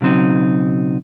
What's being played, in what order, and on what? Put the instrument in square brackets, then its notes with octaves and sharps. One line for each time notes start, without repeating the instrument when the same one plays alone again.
[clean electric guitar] B1 C#3 F#3 C4 D#4